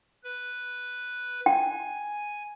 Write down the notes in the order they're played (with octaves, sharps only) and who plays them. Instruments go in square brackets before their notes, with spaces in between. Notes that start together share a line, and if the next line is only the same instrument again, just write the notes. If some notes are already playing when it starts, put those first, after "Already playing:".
[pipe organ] B4
[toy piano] G5 [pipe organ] G#5